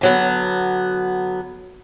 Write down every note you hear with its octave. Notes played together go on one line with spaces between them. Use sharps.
D3 F#3 B3